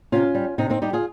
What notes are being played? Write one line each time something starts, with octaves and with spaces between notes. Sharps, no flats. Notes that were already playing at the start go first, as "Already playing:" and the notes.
C3 C#4 F4
G3
C3 C4 D#4
C4 D#4
G3 D#4 G4
F4 G#4